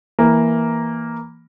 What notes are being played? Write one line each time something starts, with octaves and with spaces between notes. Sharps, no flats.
E3 A#3